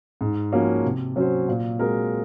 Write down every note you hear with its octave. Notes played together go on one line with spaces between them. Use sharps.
G#2
F3 A#3 C#4 F#4
C3
F#3 C#4 F#4 C5
A#2
G#3 C4 F#4 A#4